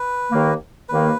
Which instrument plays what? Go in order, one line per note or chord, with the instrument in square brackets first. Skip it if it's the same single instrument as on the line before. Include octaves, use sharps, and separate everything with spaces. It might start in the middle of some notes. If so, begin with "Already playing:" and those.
Already playing: [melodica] B4
[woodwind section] D#2 D#3 A#3
[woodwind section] D#2 D#3 A#3 [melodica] B4